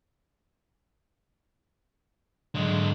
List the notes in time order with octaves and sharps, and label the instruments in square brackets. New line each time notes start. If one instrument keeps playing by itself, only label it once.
[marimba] G#2 F#3 [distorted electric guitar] D3 G#3